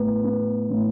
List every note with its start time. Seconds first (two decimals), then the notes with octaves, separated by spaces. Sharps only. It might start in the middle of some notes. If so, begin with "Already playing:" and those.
Already playing: A2 B3
0.24 B3
0.70 A2